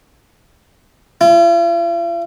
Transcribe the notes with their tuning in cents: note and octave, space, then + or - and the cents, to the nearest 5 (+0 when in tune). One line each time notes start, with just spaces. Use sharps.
F4 -45